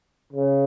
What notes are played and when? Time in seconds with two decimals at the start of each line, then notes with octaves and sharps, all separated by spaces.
0.33 C#3